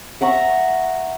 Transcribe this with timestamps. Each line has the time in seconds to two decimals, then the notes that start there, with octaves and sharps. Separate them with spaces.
0.21 E5 F#5 A#5 C#6